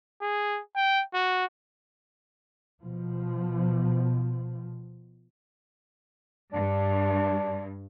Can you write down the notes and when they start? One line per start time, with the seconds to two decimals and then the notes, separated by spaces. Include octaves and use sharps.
0.22 G#4
0.76 G5
1.14 F#4
2.82 B2 F3
6.53 G2 D4